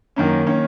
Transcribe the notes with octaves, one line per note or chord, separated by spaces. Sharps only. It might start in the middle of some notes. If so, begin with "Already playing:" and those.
F#2 D#3 A#3 C#4
D#3 A#3 C#4